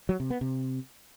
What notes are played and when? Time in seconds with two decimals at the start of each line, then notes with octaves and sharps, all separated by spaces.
0.09 F#3
0.20 C3
0.30 B3
0.41 C3